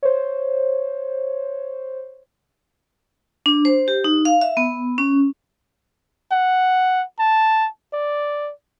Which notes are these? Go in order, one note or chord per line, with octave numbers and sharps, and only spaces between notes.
C5 C#5
D4
C5
G4
D#4
F5
E5
B3
C#4
F#5
A5
D5